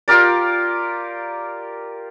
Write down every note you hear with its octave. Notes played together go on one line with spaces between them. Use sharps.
F4 G4 A#4 D5